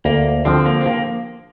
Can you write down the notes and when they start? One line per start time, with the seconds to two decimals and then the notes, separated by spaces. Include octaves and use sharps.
0.05 D2 A#3
0.45 D3 F3 C4
0.66 A#3
0.81 C4
0.86 A#3